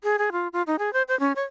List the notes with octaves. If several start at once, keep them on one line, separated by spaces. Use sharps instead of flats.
G#4
G#4
F4
F4
D#4
G#4
C5
C5
C#4
C#5